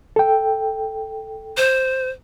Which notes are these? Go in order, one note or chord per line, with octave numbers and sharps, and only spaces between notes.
A4 G5
C5